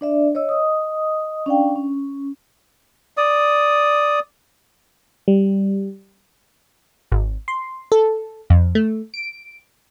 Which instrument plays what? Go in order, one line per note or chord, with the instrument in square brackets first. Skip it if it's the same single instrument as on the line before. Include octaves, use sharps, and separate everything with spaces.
[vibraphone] D4 D5 E5
C#5 D#5 E6
D#5 D#6
C#4 D4 D5 F5 G5
C#4
[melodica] D5 D#6
[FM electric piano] G3
[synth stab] G#1
C6
A4
F2
A3
D7